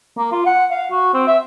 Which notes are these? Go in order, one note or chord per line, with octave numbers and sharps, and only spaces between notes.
A#3
F4
F#5
F5
F#4
C4
E5